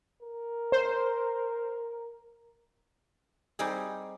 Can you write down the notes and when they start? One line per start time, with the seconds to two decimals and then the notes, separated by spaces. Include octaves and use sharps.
0.22 A#4
0.72 C5
3.59 G3 C4 D#4 G4 G#4